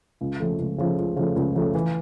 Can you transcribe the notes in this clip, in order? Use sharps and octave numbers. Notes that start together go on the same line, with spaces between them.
C#2
C#3 F3 A3
C#2
C#3 F3 A3
C#2
C#3 F3 A3
C#2
C#3 F3 A3
E3